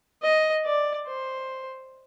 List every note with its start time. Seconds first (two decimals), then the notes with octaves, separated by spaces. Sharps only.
0.22 D#5
0.64 D5
1.07 C5